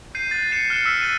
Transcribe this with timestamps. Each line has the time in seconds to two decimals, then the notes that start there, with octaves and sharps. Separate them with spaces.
0.15 G6 C7 D#7
0.31 F#6 G6 A6
0.51 A6 C7 C#7 E7
0.70 F6 F#6 C#7 E7
0.86 E6 B6
1.01 F#6 A6 D#7